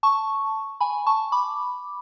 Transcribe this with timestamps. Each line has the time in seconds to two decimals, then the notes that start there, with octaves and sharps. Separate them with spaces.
0.03 A5 C#6
0.80 G#5 B5
1.06 A5 C#6
1.32 B5 D6